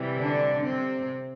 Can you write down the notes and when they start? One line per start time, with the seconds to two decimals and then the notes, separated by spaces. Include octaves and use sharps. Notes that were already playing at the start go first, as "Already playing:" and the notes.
Already playing: C3 E3 G3
0.19 D3 D4
0.64 C3 C4